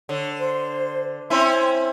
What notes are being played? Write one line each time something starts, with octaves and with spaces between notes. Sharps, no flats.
D3 C#5
C5
C4 C#4 E4 C6